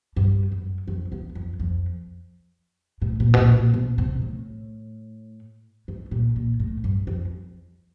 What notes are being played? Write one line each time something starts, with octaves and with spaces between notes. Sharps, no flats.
G2
F#2
F2
E2
F2
F2
A2
A#2
B2
A#2
A#2
B2
C3
A2
G#2
A#2
A#2
A2
G2
F2